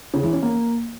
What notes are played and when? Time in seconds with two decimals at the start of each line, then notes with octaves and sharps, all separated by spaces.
0.14 C#3
0.23 E3
0.33 C#4
0.42 A#3